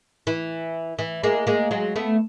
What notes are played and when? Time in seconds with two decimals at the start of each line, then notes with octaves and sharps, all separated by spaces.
0.27 E3
0.99 E3
1.23 G#3 A#3
1.47 G#3 A#3
1.71 F#3 G#3
1.96 A3 B3